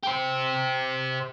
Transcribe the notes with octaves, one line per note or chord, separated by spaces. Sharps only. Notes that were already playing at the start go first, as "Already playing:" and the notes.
G4 C5